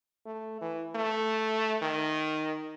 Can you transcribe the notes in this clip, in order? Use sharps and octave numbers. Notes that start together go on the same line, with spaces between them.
A3
E3
A3
D#3